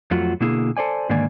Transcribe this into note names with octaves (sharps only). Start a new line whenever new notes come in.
F2 F#3 A3 F4 F#4
B2 D3 A#3 E4 G#4
A4 C5 D5 G#5
G#2 D3 D#3 A#3 D5 G#5